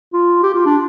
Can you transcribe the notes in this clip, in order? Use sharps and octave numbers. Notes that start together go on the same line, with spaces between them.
F4
G4
F4
D4